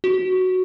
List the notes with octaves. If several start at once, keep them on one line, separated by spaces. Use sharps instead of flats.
F#4